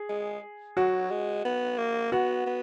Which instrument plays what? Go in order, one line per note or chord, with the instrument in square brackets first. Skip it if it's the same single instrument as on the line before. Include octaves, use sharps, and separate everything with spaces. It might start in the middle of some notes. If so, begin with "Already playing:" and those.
Already playing: [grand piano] G#4
[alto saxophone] G#3
[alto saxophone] F#3 [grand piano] F#4
[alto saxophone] G#3
B3
A#3
[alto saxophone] B3 [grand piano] F#4
[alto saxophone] B3